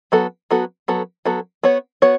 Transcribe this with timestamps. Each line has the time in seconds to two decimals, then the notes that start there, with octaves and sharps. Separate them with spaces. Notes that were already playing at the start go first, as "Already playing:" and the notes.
0.12 F#3 B3 F#4 A4
0.51 F#3 B3 F#4 A4
0.88 F#3 B3 F#4 A4
1.25 F#3 B3 F#4 A4
1.63 B3 F#4 C#5
2.02 B3 F#4 C#5